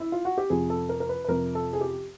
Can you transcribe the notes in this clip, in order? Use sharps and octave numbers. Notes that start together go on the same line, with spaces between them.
E4
F4
F#4
G4
F2 C3 F3 G#4
A4
A#4
A#4
B4
B4
F2 C3 F3 A#4
A4
G#4
G4